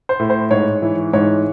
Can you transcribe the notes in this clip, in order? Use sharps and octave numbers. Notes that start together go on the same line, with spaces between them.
C5
A2
C5
G#2 C#5
E3
G#2 C#5